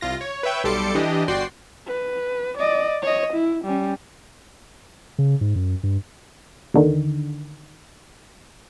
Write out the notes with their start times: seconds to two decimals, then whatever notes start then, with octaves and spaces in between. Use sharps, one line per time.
0.01 C2 F4 A#6
0.21 C#5
0.43 B4 C#5 E5 G5
0.64 B1 G3 A4 C6 D6 C#7
0.95 E3 D4 G4 D#5
1.28 G1 F#4 D5 G5 C6 C7
1.88 B4
2.58 D5 D#5
3.02 C#5 D#5
3.33 E4
3.65 G3 C#4
5.18 C#3
5.41 G#2
5.56 F#2
5.83 G2
6.74 D#2 D3 D#3